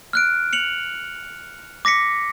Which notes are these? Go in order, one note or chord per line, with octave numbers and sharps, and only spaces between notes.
F6 F#6 D7
C#7 F7 F#7
D6 A#6 B6 C#7